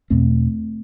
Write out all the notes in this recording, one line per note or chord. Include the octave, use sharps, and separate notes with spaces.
E2 B2 A3 C4